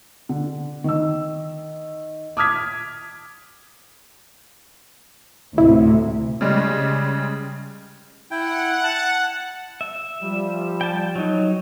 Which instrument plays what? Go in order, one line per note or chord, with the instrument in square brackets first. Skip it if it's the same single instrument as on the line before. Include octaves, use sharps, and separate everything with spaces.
[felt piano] D3
D#3 E6
D6 D#6 F6 G#6 B6
[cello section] D2 A2 C3 [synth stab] E4
[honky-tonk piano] C#3 G3 G#3
[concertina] E4 G5 [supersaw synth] F#5
[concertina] A5
[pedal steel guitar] E5
[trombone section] F3 G3
[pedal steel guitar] G5 A5
F#3 D#4